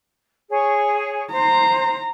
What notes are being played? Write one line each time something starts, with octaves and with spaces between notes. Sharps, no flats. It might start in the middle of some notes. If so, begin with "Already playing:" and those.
G#4 C#5
C5 A#5